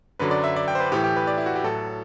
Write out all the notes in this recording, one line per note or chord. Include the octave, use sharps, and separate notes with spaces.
F#2 D3 F#3 B4
D5
E5
D5
G5
C5
B4
A2 E3 G4
G4
B4
D5
E4
F#4
G4
A2 F#3 A4